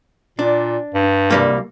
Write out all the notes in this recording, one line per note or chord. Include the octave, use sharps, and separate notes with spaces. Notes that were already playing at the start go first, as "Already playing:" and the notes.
A#2 D4
G2
C2 G3 A#3